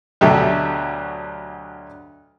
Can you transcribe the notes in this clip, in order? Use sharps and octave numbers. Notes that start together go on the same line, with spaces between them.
D2 B2 F#3 G4 A4 E5